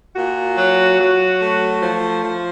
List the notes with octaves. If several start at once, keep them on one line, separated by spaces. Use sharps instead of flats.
A#2 F#4
F#3
F#3
A3
F3 C5
F3 C5